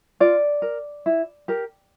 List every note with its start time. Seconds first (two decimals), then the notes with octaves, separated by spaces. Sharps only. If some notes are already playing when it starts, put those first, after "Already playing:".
0.20 F4 D5
0.62 A#4
1.06 E4
1.48 G4 A#4